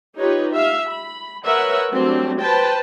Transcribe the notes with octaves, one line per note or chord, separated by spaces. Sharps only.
D#4 F4 G4 B4 C#5
E5 F5
B5
A#4 B4 C#5 E5 F#5
F#3 G3 A3 C4 D4
B4 C5 G5 A5